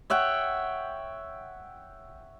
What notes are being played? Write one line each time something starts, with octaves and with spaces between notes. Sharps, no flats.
C#5 E5 F#5 G5